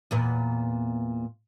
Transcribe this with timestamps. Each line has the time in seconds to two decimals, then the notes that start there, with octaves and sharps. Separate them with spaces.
0.11 E2 A#2 B3